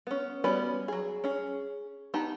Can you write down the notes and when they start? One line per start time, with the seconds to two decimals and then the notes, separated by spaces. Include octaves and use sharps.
0.07 B3 C#4
0.44 G3 B3 C#4 F#4 B4
0.88 F#3 G#4
1.24 C#4 G#4
2.14 B3 D#4 G4 A5